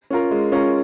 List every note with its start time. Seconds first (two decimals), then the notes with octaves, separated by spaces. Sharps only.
0.10 C#4 F4 A#4
0.31 G#3
0.52 C#4 F4 A#4